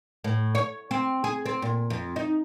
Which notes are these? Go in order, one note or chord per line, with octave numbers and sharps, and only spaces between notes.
A2
C#5
C4
G#4
C4
A#2
F2
D#4